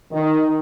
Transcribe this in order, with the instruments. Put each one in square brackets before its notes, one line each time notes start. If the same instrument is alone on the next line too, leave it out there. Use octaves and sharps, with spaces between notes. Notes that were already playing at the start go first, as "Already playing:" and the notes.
[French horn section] D#3